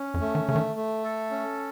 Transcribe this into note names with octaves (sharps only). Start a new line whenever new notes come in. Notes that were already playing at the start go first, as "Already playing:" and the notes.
Already playing: C#4
F2
A3
D#3
C#3 A3
D#3
A3
A4
C#4